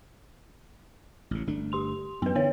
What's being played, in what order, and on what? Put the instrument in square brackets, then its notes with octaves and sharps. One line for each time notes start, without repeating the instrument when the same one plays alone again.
[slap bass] A1 C#3
G1 A3 D4
[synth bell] G4 C6 F7
[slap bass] F#2 E3 [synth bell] B3 B4
[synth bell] D3 B3 C#5 [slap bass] E3